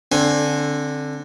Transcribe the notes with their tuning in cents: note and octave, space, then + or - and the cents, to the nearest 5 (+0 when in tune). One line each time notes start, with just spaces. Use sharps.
D3 +0 C4 +20 G#5 +5